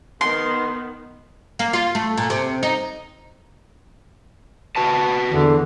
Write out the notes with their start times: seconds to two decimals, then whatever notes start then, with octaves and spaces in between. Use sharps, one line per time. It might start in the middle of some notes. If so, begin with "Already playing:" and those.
0.21 D#3 B3 C6
1.59 A#3
1.73 F4
1.95 A3
2.17 A#2
2.30 C3
2.63 D#4
4.76 F#4 B4 A5
5.29 E2 D3